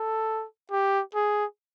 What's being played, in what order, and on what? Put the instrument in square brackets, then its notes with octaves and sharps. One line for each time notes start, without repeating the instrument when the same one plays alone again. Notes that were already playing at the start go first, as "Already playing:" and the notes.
Already playing: [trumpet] A4
G4
G#4